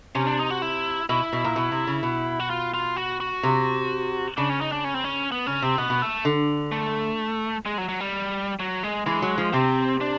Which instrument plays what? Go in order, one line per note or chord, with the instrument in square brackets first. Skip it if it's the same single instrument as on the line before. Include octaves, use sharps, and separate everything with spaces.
[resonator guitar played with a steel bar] C3 [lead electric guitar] C#4
[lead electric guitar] D4
D#4
F#4
E4
[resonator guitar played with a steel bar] B2 [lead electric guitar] E4
[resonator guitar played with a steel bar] B2
A#2
B2
C3
C#3
B2
[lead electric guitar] F#4
F4
F4
F#4
F#4
[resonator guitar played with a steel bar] C3
[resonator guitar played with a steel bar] C#3 [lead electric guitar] D4
[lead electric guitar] C#4
D#4
D4
C#4
C4
C#4
B3
[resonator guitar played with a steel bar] C#3 [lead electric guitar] C#4
[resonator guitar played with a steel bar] C3 [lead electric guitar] C4
[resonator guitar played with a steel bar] B2 [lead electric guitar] B3
[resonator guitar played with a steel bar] B2
[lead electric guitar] A3
[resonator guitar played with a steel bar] D3
[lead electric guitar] A3
G#3
F#3
F#3
G3
F#3
G#3
[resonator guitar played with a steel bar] E3 [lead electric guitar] G#3
[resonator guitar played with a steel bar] F#3
F3
[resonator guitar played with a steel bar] C3 [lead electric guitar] C4
[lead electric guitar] D4